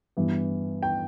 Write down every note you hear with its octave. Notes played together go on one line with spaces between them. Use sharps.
G2 E3 B3
G5